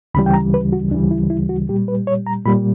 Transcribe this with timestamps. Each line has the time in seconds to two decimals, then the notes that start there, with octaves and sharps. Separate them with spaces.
0.14 D2 C#3 E3 G3 B5
0.26 G5
0.34 A#5
0.54 B4
0.72 F#4
0.91 D2 C#3 E3 G3 D4
1.11 E4
1.30 E4
1.49 F#4
1.69 A#2 G3 G4
1.88 B4
2.07 C#5
2.26 A#5
2.45 A#2 G3 B5